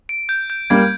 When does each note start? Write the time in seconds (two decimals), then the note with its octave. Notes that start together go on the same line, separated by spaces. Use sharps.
0.09 D7
0.29 G6
0.50 G6
0.70 G3 A#3 G#6